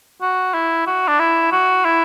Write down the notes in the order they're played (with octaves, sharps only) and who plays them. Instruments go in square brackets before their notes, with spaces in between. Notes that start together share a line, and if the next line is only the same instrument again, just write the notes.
[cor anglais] F#4
E4
F#4
D4
E4
F#4
E4